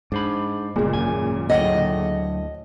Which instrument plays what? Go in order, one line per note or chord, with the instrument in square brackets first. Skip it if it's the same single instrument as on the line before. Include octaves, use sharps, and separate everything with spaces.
[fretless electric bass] G#2 [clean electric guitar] D4 C5 B5
[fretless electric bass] G1 G#3 [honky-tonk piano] A#2 C#3
[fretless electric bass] G#1 F#2 [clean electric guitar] G#5
[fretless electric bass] D2 A2 [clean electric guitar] F#3 F#5 G5 [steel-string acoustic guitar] D#5